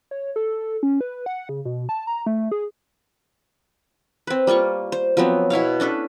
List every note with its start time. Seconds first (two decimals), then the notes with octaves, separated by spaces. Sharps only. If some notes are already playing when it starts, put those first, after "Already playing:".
0.11 C#5
0.36 A4
0.83 C#4
1.01 B4
1.26 F#5
1.49 C#3
1.65 B2
1.89 A5
2.07 A#5
2.26 A3
2.52 G#4
4.27 C4 B4
4.47 G3 A#3 F4 C#6
4.92 C5
5.17 F3 F#3 B3 C4
5.50 B2 E4 C#5 F5
5.80 C#4 D4 A4 B4